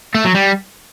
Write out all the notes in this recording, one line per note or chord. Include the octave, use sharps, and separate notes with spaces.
A3
F#3
G3